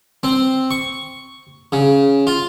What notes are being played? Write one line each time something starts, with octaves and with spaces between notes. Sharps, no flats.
C4
C#6
C#3
F4